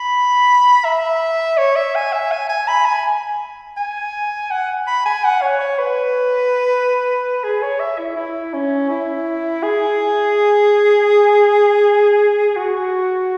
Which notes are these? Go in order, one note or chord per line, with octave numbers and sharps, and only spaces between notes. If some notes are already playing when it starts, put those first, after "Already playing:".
Already playing: B5
E5
C#5
E5
G#5
E5
G#5
G#5
B5
G#5
G#5
F#5
B5
G#5
F#5
C#5
C#5
B4
G#4
C#5
E5
E4
E4
C#4
E4
G#4
F#4